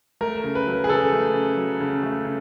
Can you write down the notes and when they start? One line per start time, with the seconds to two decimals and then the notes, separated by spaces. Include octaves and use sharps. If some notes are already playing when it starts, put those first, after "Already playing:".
0.21 A3 A#4
0.44 C#3
0.55 B4
0.67 F#3
0.84 G#4
0.89 C#3 A4
1.12 A3
1.34 C#3
1.57 F#3
1.80 C#3
2.03 A3
2.25 C#3